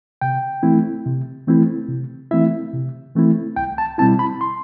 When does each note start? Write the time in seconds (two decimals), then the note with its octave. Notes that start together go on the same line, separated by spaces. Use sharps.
0.21 C3 G5
0.63 E3 A3 C4 E4
1.06 C3
1.47 E3 A3 C4 E4
1.88 C3
2.31 E3 A3 C4 E4 E5
2.73 C3
3.16 E3 A3 C4 E4
3.56 C2 G5
3.78 A5
3.98 B2 G3 C4 E4 A5
4.19 B5
4.41 C6